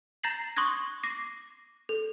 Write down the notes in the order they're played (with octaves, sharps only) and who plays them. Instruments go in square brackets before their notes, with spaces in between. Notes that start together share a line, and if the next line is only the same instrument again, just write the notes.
[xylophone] A#5 G6 A6 A#6 C7 F#7
C6 C#6 D#6 F#6 G#6 A#6
D6 A#6 C7
A4